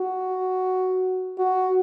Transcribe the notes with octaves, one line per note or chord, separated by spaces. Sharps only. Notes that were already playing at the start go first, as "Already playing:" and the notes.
Already playing: F#4
F#4